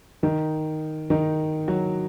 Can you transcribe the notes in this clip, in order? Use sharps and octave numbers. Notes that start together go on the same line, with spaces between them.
D#3 D#4
D#3 D#4
F#3 F#4